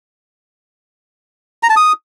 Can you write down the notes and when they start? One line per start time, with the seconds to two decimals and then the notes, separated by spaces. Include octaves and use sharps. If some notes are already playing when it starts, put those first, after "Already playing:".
1.63 A#5
1.70 A5
1.76 D#6